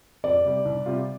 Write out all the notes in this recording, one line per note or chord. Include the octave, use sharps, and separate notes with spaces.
F2 D5
C3 G3
C2
C3 G3 F4